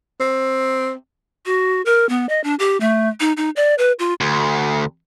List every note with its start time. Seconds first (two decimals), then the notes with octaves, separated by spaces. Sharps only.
0.20 C4
1.46 F#4
1.86 A#4
2.09 B3
2.29 D#5
2.44 D4
2.59 G4
2.80 A3
3.20 D#4
3.37 D#4
3.56 D5
3.78 B4
3.99 F4
4.21 D2